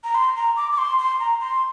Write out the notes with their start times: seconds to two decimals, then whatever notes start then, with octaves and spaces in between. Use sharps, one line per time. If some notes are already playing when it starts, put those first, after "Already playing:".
0.04 A#5
0.15 C6
0.36 A#5
0.57 D6
0.72 D6
0.78 C6
0.99 C6
1.20 A#5
1.41 C6